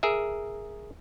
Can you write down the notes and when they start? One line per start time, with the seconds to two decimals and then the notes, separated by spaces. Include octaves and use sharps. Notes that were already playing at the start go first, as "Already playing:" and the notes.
0.03 G#4 A#4 E5